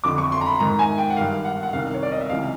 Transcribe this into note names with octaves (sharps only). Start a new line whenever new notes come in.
F2 D3 F3 D6
C#6
C6
A#5
B5
G#2 D#3 A#5
G#5
G5
F#5
G2 D#3 F5
F#5
F#5
C2 C3 D#3 F5
C#5
D5
D#5
E5
C#2 C3 E3 F5